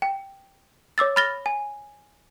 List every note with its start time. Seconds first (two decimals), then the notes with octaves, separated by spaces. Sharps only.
0.02 G5
0.98 C#5 D6 E6 A6
1.16 B5 F6 A6 A#6 G7
1.46 G#5